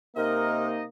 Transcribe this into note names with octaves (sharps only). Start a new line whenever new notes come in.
C3 A#3 D#4 A#4 D#5